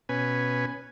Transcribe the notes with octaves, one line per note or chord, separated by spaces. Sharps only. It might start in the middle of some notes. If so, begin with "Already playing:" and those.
B2 C#4 B4 G#5